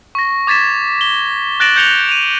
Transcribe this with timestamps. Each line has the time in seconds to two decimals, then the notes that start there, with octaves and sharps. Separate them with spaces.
0.15 C#6 A#6
0.47 D6 G#6 A6 B6 E7
1.01 G7
1.60 F#6 A6 A#6 D7 E7 F#7
1.76 F#6 G6 C#7 F7 G7
2.09 D#7 F7